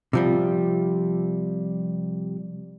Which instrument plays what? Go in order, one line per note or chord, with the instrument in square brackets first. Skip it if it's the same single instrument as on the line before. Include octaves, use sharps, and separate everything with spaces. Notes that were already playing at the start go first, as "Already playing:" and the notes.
[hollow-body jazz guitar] C3 F3 G3